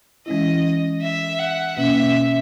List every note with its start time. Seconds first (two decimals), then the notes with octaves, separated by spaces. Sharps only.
0.26 E3 G#3 C#4 E4 D#5
1.02 E5
1.39 F#5
1.77 B2 A#3 C#4 E5